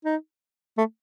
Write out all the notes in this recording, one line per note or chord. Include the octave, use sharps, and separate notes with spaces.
D#4
A3